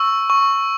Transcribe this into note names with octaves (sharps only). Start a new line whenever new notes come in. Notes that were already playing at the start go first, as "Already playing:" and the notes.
Already playing: C#6 E6
C#6